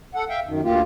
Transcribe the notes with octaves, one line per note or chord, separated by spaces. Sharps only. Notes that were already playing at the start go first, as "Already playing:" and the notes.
A4 F#5
E5 F5 G5
F#2 D#3
D2 A#3 F4 G4